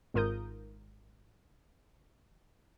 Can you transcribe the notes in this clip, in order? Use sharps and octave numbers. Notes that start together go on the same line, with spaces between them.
G#1 G#2 F4 A#4 D#6 G6